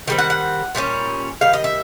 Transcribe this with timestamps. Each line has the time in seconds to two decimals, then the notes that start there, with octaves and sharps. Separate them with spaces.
0.07 D#3 G3 C4 G5
0.18 F#5
0.30 F#5
0.75 A#2 G3 A#3 C#4
1.41 D#3 G3 F5
1.53 D#5
1.64 E5